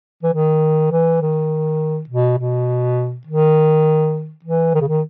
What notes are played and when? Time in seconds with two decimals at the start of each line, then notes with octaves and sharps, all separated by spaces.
0.23 E3
0.33 D#3
0.91 E3
1.21 D#3
2.09 B2
2.38 B2
3.27 D#3
4.44 E3
4.74 D#3
4.81 C#3
4.88 D#3